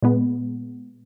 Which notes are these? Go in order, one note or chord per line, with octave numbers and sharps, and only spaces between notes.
A#2 G#3 B3